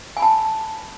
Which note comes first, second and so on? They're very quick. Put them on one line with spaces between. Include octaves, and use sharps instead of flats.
G#5 B5 A5